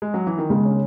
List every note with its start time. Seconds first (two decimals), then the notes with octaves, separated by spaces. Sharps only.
0.02 G#3
0.14 F#3
0.27 E3
0.38 D#3
0.50 C#3 G#3
0.65 C#4